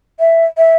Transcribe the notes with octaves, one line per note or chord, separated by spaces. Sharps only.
E5
E5